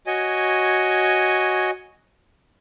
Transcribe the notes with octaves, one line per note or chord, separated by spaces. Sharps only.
F#4 C#5 D#5 G#5